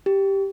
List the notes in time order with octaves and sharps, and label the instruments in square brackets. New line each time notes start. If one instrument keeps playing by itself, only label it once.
[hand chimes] G4